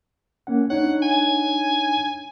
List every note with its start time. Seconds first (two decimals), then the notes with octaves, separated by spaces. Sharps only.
0.47 A#3 C#4 F#5
0.70 D4 D#4 C#5 F#5
1.03 G#5